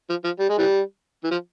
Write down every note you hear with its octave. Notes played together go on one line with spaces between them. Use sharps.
F3
F3
G3
G#3
E3 G3
E3
F3